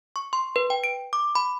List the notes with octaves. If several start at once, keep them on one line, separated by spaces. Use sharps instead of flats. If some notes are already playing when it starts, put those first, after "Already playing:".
C#6
C6
B4
G5
D7
D6
B5